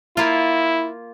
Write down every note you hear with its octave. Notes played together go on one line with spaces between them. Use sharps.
A#3 E4 F4